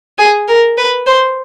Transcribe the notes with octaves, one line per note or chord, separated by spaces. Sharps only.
G#4
A#4
B4
C5